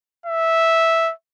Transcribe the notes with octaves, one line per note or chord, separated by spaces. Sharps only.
E5